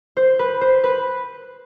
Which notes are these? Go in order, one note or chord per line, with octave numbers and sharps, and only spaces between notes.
C5
B4
C5
B4